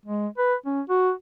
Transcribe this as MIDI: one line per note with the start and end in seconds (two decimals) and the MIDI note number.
0.06 0.28 56
0.38 0.55 71
0.66 0.81 61
0.90 1.12 66